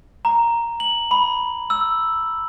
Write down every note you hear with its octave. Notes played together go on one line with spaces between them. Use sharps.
A#5
F#7
B5
E6